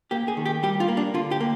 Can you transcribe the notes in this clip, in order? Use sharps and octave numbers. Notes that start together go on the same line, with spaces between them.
A#3 G4
G#4
D#3
G4
G3 G4
F4
A#3
D4
D3 F4
G4
A#3